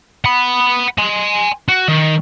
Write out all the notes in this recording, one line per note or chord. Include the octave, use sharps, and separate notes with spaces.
F#5 B5
G#5 C6
F#4
D#3